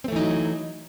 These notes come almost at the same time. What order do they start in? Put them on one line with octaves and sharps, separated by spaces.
C4 A3 E3 D#4 F#3